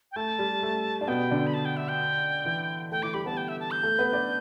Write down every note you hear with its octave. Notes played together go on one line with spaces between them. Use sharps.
G5
A3 A5
G3
A3
D4 A5
B2 B3 G5
D3 D4
B5
A5
G5
E5
G5
E3 E4
A3 A4 G5
E3 E4 D6
G3 G4 B5
B3 B4 A5
G5
E5
A5
G6
A3 A4
B3 B4
D4 D5